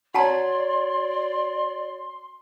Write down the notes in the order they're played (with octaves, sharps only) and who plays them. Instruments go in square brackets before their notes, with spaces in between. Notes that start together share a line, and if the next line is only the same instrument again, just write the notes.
[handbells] F#4 C#5 [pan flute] D5 [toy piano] F#5 A5 A#5 [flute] C6